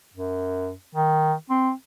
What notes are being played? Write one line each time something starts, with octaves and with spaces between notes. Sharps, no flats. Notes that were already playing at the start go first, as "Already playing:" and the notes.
F#2
D#3
C4